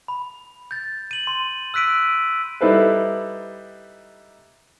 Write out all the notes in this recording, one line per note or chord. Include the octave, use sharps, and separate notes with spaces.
B5
G6 A6
D#7 F#7
C6
E6 F#6 B6 D7 D#7
G3 D#4 E4 A4 B4 C5